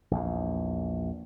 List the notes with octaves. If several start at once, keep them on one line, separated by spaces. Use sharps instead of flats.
A#1 E2